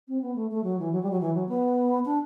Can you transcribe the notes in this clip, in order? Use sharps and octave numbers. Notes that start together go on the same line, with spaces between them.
C4
B3
A3
A3
F#3
E3
F#3
G3
F#3
E3
F#3
B3
D4